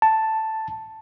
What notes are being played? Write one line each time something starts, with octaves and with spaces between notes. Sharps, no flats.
A5